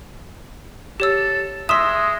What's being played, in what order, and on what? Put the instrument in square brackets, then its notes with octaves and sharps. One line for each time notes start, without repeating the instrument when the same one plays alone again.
[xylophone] G4 C#5 E6 [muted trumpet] A4
[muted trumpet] G#3 [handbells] E5 C6 E6 [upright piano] D#6 [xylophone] B6 E7